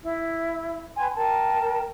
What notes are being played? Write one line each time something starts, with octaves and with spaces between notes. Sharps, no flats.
E4
B4 G5 G#5 C6
A#4 G5 A5